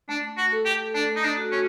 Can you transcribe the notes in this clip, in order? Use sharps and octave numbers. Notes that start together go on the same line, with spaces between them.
A3 D4
F#4
A4
G4
A3 D4
D#4
D4
F#4
C#4